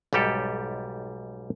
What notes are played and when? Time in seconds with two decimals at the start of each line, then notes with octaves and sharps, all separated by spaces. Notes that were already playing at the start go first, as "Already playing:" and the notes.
0.13 B1 G#2 G3 G4 A4